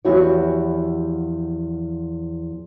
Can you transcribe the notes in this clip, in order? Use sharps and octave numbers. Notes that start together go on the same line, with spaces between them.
E2 F3 E4 F#4 G4 C#5